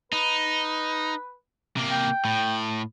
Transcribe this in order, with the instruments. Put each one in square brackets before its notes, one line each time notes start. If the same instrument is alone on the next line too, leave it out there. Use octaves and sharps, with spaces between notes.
[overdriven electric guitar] D#4 [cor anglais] B4
[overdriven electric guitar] C3 A#3
[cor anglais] G5
[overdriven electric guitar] A2